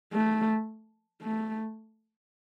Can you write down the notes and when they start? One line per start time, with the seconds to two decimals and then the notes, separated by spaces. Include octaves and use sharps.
0.13 A3
1.22 A3